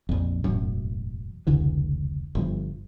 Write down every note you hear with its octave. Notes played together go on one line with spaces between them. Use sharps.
A#1 F2
E1 A1 F#2
F1 C#2 D3 E3
G1 G2 F3